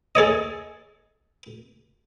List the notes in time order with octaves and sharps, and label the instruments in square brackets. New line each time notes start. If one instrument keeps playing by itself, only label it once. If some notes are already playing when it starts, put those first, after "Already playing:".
[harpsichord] G#4 A4 C#5 D#5